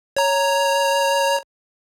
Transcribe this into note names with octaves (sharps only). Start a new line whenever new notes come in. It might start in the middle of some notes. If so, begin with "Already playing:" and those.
C#5 A#5